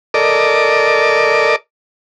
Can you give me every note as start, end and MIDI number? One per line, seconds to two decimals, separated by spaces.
0.14 1.56 69
0.14 1.56 70
0.14 1.56 74
0.14 1.56 75
0.14 1.56 86